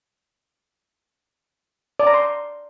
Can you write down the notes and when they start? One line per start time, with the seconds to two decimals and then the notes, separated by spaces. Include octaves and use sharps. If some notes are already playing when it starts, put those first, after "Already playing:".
2.00 D5
2.07 A#5
2.14 C6